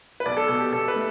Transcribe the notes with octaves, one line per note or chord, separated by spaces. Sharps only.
B4
B1 D5
A4
B2 A4
G4
B2 A4
B4
A3